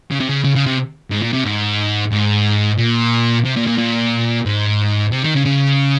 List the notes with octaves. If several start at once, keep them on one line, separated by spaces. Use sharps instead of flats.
C#3
C3
C#3
C#3
C#3
C3
G#2
A#2
C3
G#2
G#2
A#2
C3
A#2
A#2
A#2
G#2
C3
D#3
C#3
C#3